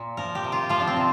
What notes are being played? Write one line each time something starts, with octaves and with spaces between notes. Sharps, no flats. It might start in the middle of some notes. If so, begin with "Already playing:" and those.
Already playing: A#2
F3 A#4
G4
C3
F4
F3 F4
D4
C4
C3